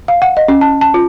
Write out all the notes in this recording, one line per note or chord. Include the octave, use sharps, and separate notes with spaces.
F5
F#5
D#5
C#4
A5
A5
F4